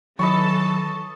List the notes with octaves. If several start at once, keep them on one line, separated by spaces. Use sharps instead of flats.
D#3 E3 F#3 A4 D#5 A5 B5 C#6